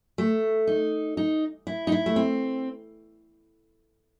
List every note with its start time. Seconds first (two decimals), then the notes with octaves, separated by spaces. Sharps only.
0.18 A3
0.67 D#4
1.17 D#4
1.67 E4
1.87 D#4
1.92 E4
2.06 A3
2.16 C4